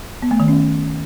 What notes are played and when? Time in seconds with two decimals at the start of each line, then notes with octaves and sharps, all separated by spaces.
0.22 B3
0.31 A3
0.40 D#3
0.48 C#4